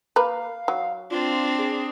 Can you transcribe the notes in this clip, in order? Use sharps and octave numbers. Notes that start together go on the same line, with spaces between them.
A#3 A#4 B4 F5
F#3
C4 D4 F4
G#4